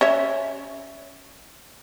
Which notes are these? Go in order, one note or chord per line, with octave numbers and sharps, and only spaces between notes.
C#4 C#5 E5